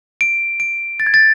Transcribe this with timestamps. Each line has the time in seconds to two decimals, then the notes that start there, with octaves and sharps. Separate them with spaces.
0.21 D7
0.60 D7
1.00 A6
1.07 G#6
1.14 A6